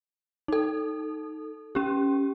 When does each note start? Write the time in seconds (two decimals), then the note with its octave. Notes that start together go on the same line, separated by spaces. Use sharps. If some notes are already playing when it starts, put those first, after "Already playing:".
0.48 D#4 A4
1.75 C#4 G4